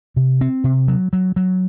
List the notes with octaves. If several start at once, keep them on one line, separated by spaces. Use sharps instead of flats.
C3
C4
C3
F#3
F#3
F#3